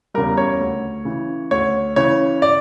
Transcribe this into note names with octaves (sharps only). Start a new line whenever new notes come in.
E2 C#3 G3 A#4
C#5
D2
C#3 E3
D2 C#5
C#3 E3 C#5
D5